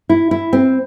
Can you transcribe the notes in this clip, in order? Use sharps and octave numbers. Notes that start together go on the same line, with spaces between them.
E4
E4
C4